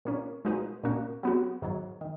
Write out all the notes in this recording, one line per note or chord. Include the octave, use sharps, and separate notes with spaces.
A#2 A#3 C#4
A#2 G#3 D#4 F#4 B4
A#2 A#3 C#4 F#4
F#3 B3 F#4
G#2 D#3 F#3
D#3